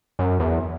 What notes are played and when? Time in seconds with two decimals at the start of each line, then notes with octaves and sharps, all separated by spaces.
0.19 F#2
0.40 E2